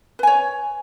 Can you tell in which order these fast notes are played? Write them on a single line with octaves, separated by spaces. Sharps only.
B4 G#5 C#5